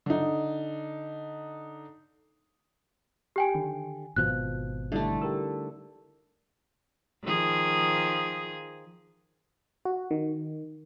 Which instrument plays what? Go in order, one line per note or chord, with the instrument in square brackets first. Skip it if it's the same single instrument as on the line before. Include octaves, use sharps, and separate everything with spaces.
[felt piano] D3 D#4
[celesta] G4 G5 G#5
[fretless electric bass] D3 [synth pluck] D#3
[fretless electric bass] G#1 B2 F3 [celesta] F#6
[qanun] D3 A3 [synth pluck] G3 D#4 E4
[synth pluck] G4 A#4 E6
[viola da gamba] D#3 F3 G#4
[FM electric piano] F#4
D#3